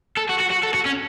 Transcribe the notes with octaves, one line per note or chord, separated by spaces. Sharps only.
A4
F#4
F#4
F#4
A4
F#4
C#4